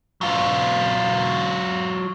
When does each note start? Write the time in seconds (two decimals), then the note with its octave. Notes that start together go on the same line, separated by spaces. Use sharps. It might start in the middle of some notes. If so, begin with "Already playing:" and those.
0.21 F#3 F4